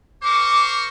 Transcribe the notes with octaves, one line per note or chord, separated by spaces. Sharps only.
A#4 C5 C#6 D6